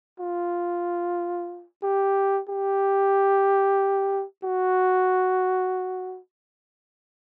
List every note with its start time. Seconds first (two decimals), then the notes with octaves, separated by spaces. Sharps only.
0.20 F4
1.83 G4
2.49 G4
4.44 F#4